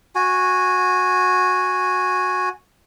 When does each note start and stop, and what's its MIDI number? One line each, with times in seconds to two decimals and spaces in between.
0.15 2.49 66
0.15 2.49 80